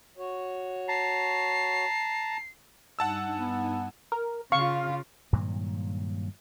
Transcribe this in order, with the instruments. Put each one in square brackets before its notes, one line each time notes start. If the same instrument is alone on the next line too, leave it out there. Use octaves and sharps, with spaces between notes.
[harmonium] F#4 C#5
[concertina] A5 A#5 [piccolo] C7
[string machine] G2 D#4 G#5 [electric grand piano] F#5 A5 E6
[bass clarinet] B3
[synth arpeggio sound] A#4
[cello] C#3 F4 [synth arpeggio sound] F5 [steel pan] C#6
[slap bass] G2 A#2 D#3 F#3